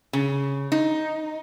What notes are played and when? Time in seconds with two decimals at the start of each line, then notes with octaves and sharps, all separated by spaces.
0.13 C#3
0.72 D#4